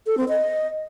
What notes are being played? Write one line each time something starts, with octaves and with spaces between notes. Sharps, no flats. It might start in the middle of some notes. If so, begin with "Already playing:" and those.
A4
C4
D#5